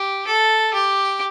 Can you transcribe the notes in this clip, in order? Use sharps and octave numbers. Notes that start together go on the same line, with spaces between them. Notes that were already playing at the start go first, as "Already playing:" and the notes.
Already playing: G4
A4
G4